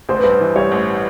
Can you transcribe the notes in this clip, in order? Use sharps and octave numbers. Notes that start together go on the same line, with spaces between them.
A1 C5
B4
G2 C5
E3
G3 C#5
A1